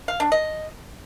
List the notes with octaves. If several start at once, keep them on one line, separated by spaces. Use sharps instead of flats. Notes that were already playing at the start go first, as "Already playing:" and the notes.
F5
D4
D#5